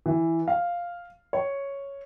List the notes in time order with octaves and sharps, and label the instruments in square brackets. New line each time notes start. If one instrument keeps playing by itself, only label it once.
[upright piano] E3
F5
C#5